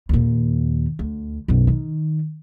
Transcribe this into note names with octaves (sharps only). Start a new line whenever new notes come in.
D#2 A#2
D2
B1 F#2
D#3